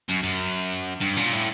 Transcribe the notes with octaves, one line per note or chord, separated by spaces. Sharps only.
F#2
F#2
G2
A#2
A2